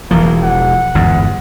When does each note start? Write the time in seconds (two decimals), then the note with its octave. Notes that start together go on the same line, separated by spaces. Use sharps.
0.11 E1 E3 F3 A#3
0.43 F#5
0.95 G1 E2 G#2